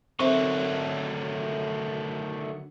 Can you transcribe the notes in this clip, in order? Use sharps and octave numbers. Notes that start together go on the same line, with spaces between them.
D3 D#3 F#3 A3 C4 C5 E5 C#6